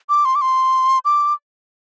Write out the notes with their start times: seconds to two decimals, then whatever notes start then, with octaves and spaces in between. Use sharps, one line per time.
0.09 D6
0.25 C6
0.35 D6
0.42 C6
1.05 D6